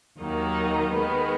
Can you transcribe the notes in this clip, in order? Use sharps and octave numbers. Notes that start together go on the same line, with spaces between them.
D#2 D#3 F#3 D#4
D#3 G#3 B3